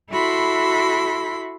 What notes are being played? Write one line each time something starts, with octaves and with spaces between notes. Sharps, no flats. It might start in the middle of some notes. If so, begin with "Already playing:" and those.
E4 F#4 A4 B5 C6